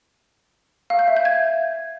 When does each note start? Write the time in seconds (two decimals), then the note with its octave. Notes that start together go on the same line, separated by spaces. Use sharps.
0.90 F5
0.99 G6
1.08 E5
1.17 G6
1.25 G#6